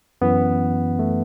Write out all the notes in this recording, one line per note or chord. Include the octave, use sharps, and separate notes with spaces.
F#2 E3 B3
A3